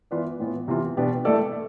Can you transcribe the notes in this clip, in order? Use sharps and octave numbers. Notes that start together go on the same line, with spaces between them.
E3 B3 F4 B4 D5
A2 E3 B3
C3 E3 B3 F4
B2 B3 D4 G4
A3 E4 A4 D5